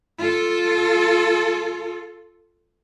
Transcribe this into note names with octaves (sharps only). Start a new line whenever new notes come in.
F4 A4